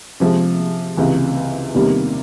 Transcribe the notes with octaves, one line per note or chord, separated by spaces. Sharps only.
C3 F3 G#3
C#2 C3 E3
E2 C3 D#3 G3 A#3